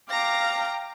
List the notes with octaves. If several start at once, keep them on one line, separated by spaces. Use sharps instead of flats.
F5 G5 A#5 D6 A#6